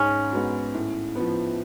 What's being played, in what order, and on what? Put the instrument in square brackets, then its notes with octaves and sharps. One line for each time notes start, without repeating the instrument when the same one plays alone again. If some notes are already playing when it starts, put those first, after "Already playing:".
Already playing: [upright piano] G#2 [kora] C#4
[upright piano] G#3 B3 F#4
A2
F3 B3